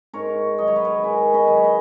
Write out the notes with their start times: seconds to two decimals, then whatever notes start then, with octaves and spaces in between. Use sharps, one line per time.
0.13 G#2 A#4 C#5
0.58 D#3 F#3 D#5
0.68 C#5
0.76 B4
0.85 A#4 C#5
1.03 G#2 G#4 B4
1.34 B4 D#5
1.47 D#3 F#3 B4
1.57 C#5
1.64 B4 D#5